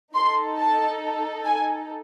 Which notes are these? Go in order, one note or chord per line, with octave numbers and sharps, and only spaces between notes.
D#4 A4 C6
A5
G#5